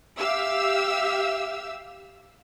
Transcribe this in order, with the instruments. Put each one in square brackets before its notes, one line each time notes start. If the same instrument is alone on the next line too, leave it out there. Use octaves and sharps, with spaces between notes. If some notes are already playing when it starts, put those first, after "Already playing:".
[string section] G4 E5 F5 E6